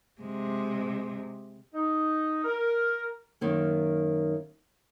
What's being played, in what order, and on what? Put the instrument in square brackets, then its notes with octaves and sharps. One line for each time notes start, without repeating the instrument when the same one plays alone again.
[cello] C3 G#3
[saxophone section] D#4
A#4
[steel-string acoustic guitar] F#2 D#3 A#3